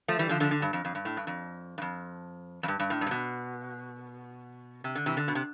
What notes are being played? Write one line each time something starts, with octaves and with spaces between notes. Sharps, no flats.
F3 A3
E3 G3
D3 F3
D3 F3
D3
G2
F2
F2
G2
A2
G2
F2
G2
F2
F2
G2
G2
A2
G2
C3
B2
C3
D3
C3 E3
D3
B2
C3